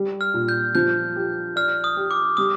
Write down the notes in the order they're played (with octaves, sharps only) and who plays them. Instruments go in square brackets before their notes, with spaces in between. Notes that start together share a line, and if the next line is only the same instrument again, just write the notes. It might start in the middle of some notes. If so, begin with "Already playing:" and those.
Already playing: [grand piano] G3
[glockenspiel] F6
[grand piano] A#2
[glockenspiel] G6
[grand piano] F3 [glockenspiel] G6
[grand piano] G4
[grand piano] D5 [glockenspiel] F6
[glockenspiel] D#6
[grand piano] G4
[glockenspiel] D6
[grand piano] G3 [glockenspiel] D#6